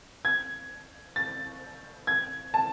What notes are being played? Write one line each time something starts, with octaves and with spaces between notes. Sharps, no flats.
G#6
A6
G#6
A5